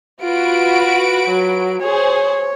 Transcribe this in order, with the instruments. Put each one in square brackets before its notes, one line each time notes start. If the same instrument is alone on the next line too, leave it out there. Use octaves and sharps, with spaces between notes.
[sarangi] F4 [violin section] F#4 B4 D7
[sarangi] F#3
[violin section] G#4 C5 [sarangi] C#5